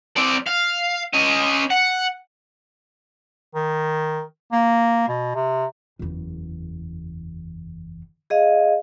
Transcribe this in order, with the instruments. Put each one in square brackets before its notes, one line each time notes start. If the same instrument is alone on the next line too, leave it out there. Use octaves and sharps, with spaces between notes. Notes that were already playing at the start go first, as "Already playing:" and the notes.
[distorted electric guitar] C4 D5
F5
C#4 D#5
F#5
[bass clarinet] D#3
A#3
B2
C3
[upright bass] F#1 E2
[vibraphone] G#4 D#5 F5